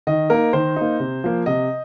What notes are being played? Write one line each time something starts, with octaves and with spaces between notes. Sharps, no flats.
D#3 D#5
A#3 D#4 A#4
D#3 C5
A#3 D#4
C3
F3 A#3
C3 D#5